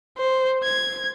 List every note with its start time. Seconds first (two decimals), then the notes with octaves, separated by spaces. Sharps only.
0.18 C5
0.64 G#6